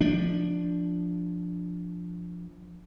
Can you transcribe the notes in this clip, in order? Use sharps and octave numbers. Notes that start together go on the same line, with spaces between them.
F3 D4